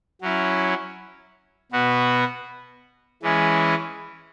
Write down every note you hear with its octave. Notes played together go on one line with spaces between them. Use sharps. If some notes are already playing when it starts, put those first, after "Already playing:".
F#3 C#4 E4
B2 B3 F#4
E3 G#3 C#4 E4